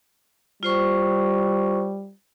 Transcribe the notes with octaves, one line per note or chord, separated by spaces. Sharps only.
G3 F4 C5 C#6